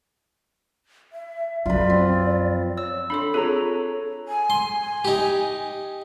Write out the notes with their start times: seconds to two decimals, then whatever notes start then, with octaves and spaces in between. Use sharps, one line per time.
1.12 E5
1.66 F#2 F3 F4 B4 D5
1.90 C4
2.77 C#5 E6
3.10 D4 A4 B5 C6
3.34 C4 F4 G#4 A4 C#5 A#5
4.28 G#5
4.50 C6
5.05 D#4 G4